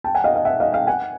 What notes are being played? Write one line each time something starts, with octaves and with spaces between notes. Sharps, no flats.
G5 A5
F#5 G#5
D#5 F5
D#5 F5
E5 F#5
D#5 F5
F5 G5
F#5 G#5